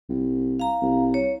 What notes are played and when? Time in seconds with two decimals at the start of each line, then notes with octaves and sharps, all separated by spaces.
0.09 C2
0.59 F5 A#5
0.81 C2
1.14 C#5